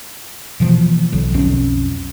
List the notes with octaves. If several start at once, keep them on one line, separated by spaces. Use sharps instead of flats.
B2 E3 F3 A#3
B1 D3 F#3
B1 F2 F3 C#4